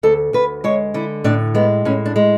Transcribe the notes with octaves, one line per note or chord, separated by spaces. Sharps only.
D2 A4
D2 B4
G#3 C#5
D3 E4
A2 D4
G#3 B3
A2 C#4
D4
G#3